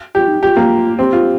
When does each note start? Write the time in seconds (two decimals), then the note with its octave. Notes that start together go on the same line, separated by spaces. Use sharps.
0.15 F4 G4
0.28 D#4
0.41 F4 G4
0.57 A#3
0.99 C4 G4
1.13 F4